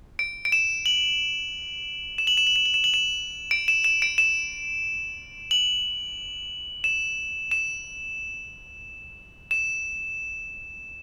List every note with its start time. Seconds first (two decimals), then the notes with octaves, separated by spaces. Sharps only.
0.19 D7
0.45 D7
0.52 E7
0.86 F#7
2.18 E7
2.27 F#7
2.37 E7
2.47 F#7
2.56 E7
2.66 F#7
2.74 E7
2.84 F#7
2.94 E7
3.51 D7
3.68 E7
3.84 E7
4.02 D7
4.18 E7
5.51 F#7
6.84 E7
7.51 E7
9.51 E7